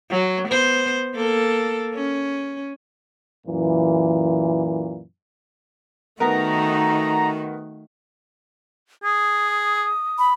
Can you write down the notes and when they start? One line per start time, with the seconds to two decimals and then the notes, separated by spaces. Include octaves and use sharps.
0.10 F#3
0.49 B3 C5
1.15 A#3 A4
1.94 C#4
3.47 F#2 A#2 E3
6.20 D#3 A3 B3 D#4 F#4 A#4 A#5
9.04 G#4 D#6
10.19 B5